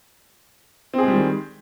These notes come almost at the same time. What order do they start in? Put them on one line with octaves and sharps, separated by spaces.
C4 G#4 G#3 G3 D#3